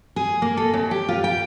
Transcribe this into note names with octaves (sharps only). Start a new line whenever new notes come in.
G#4
A#3
A4
D#2
G4
F4
G5